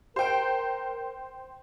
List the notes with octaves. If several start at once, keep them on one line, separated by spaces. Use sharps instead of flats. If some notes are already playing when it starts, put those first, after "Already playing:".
A#4 C5 G5